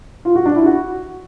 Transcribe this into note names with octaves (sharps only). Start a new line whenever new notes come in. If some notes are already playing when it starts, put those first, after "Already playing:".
F4
F#4
D4
E4
F#4